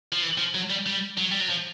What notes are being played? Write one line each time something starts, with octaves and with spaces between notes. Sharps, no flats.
F3
E3
F3
F#3
G3
G3
F#3
G3
F#3
F3